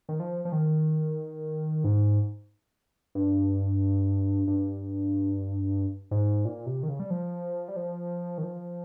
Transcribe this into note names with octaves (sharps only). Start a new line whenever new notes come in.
D#3
F3
F3
D#3
G#2
G2
G2
G#2
A#2
C3
D#3
C#3
G3
F3
G3
F3
D#3
F3